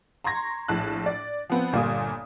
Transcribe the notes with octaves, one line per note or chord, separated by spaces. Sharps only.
A#5 C6 C#6 G#6 A#6
A#1 A2 A5 F#6
D5
F3 B3 C4
G1 A#2 G3 A#3 G#5 D#6